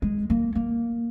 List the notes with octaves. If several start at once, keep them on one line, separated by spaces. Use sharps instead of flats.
G#3
A#3
A#3